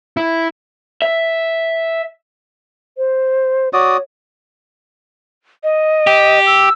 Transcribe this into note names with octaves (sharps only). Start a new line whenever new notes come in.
E4
E5
C5
F#4 C#5 D5 D#6
D#5
G4
E6